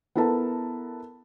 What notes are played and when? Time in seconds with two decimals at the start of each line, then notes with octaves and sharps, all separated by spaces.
0.15 B3 E4 A4 A#4 A5